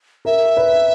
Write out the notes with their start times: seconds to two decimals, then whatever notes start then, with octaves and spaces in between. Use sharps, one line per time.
0.25 A#4 E5
0.57 B4